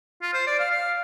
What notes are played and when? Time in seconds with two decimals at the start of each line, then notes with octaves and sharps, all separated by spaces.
0.22 F4
0.34 C5
0.47 D5
0.60 F5
0.71 F5